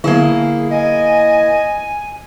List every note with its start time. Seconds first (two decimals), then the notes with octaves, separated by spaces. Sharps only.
0.04 D3 F#3 A#3 B3 E4 G#4
0.71 D#5 G#5